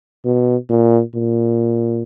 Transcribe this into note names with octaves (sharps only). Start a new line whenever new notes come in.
B2
A#2
A#2